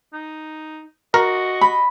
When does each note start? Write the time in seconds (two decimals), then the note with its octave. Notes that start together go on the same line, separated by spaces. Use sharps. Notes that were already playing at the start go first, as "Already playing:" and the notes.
0.13 D#4
1.14 F#4 A#4 D#5
1.61 B5